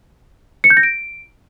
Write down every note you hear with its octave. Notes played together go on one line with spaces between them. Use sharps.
C#7
G6
A#6
D7